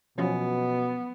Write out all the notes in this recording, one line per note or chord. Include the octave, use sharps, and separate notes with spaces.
B2 F3 F#3 B3 C#4